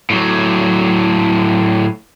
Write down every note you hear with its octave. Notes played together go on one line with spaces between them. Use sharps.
A2 F#3